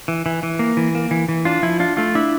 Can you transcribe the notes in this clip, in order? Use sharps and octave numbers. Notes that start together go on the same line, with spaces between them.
E3
E3
E3
A#3
E3
A#3
E3
E3
D4 F4
F3 E4
D4 F4
A3 F4
D4 E4